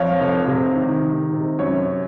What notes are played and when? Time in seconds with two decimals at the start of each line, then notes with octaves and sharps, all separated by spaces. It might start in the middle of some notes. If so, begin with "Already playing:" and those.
Already playing: F2 C#5 F5
0.20 F1
0.47 C3
0.76 D#3
1.04 D#3
1.32 C3
1.59 F#2 C#5